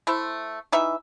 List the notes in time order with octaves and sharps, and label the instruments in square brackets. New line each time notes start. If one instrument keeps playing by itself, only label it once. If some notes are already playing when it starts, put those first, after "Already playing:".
[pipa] A3 E4 C5
E3 D#4 E5